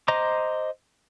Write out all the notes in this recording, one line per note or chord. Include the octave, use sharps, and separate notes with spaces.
C5 D#5 A#5 C6 D6